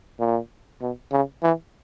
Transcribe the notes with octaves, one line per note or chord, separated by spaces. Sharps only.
A#2
B2
C#3
E3